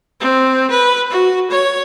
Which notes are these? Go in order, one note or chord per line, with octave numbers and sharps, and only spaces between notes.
C4
B4
F#4
C#5